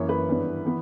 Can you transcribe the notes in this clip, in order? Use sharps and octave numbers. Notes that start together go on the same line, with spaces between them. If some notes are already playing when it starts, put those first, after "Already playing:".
Already playing: F#2 E3 A#3 C#5
B4
G2 E3 B3
E3 B3